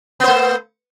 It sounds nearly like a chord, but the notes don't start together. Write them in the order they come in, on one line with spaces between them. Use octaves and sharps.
B3 C5 A3